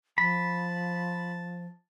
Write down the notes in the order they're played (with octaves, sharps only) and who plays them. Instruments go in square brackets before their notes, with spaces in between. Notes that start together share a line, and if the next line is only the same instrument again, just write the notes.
[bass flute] F3 [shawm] A5 [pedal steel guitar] B5